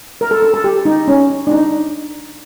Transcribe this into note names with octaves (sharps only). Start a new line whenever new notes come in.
A#4
A4
A4
A4
G4
D#4
C#4
D4
D#4